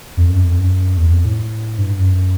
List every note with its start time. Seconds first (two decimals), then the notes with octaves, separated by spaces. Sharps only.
0.17 F2
0.30 F#2
0.44 F2
0.58 F#2
0.97 E2
1.11 F2
1.25 A2
1.78 G2
1.99 F#2